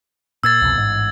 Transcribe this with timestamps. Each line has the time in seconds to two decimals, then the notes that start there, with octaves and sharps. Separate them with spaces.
0.43 A#2 E6 G#6 A6
0.61 C2 F2 B2
0.77 A1 G#2